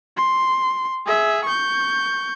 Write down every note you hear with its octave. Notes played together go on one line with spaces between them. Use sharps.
C6
G#4 E5
C#6 G6